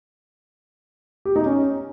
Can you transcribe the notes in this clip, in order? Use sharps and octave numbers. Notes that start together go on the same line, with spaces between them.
G4
D#4
C#4